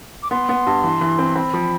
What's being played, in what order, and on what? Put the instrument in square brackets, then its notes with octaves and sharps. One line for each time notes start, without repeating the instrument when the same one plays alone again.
[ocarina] D6
[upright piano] B3 [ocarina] C6
[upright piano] B3
G2
E3
E3
C4
[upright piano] C4 [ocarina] B5
[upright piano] F3